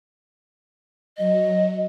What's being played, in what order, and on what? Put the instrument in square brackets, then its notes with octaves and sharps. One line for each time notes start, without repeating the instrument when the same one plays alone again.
[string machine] F#3 [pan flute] D#5